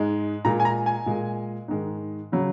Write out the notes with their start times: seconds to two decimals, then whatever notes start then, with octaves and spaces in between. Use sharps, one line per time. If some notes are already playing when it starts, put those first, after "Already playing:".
Already playing: G#2 G#3
0.45 A#2 G#3 A#5
0.60 G#5
0.65 A#5
0.86 G#5
1.06 A#2 G#3
1.68 G#2 D#3 G#3
2.32 C#3 F#3